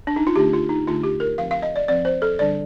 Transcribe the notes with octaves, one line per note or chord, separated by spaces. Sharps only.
D4
D#4
F4
D3 A3 D4 G4
F4
D#4
D3 A3 D4 F4
G4
A#4
F3 C4 F5
F5
D#5
D5
F3 C4 D5
C5
A4
D3 G3 D4 D5